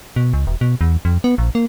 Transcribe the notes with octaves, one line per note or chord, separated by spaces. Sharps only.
B2
C#2
E1
B2
E2
F2
B3
A#1
A#3